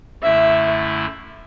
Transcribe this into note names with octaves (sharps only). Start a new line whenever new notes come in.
F#2 D3 A3 E4 E5